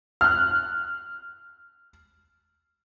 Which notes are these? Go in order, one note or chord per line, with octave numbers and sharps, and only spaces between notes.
F6 F#6